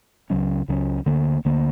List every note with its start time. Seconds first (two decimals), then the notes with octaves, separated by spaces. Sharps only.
0.30 C#2 C#3 F#3 C#4
0.68 C#2 C#3 F#3 C#4
1.06 D2 D3 A#3
1.45 D2 D3 A#3